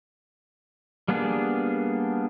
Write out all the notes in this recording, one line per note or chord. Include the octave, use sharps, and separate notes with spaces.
G3 A#3 B3 D4 G#4